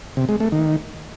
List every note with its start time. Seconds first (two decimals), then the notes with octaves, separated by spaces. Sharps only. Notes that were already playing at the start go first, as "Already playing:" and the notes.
0.17 C3
0.29 G#3
0.40 A3
0.52 D#3